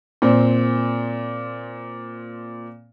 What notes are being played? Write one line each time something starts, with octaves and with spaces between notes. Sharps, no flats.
A#2 C4